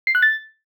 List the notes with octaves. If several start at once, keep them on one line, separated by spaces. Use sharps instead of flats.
C7
F#6
A6